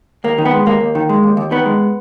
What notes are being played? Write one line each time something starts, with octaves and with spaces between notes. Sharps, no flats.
D#2 A#3
D#3
B3
G#3
D#2 A#3
D#2
D#3
G#3
D#2
D#2
D#3 B3
G#3